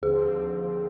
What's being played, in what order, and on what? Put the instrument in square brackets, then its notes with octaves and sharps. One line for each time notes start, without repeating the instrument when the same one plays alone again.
[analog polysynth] D#2 D3 F3 C4 [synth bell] G#4